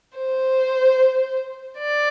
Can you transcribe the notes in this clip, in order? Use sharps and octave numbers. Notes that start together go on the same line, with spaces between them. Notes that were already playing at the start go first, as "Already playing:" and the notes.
C5
D5